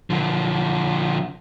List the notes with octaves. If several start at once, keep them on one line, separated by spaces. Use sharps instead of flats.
D3 F3